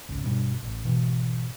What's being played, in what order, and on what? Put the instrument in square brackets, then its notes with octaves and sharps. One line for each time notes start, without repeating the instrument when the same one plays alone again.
[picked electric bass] G#1 C#2
G1 B2 G3 D4
A1
G#1 B2 E3